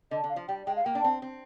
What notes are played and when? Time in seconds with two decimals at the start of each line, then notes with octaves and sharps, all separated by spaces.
0.11 D3 D#5
0.24 D3
0.29 F5
0.36 F3
0.48 G3 G5
0.67 G#3 G5
0.76 F5
0.85 A#3 G5
0.95 D4
1.04 C4
1.22 C4